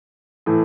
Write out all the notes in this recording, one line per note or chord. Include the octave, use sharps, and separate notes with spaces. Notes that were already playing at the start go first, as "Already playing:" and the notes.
A2 E3 A3